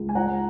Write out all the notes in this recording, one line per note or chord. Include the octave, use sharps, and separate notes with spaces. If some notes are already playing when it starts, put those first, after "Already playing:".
Already playing: C#2
G#5
F4 F#5 A#5